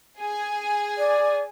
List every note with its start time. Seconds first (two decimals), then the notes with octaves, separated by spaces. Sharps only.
0.19 G#4 G#5
0.98 D5